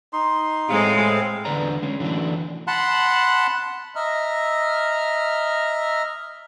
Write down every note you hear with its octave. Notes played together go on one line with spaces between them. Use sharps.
D#4 C6
A2 G#3 C4 F5
E2 G2 D3 B4 D5 A#5
G#3 C#4
D3 E3 F#3 A3 D4
F#5 A5 B5 C6 F#6
D#5 E5 A#5 F6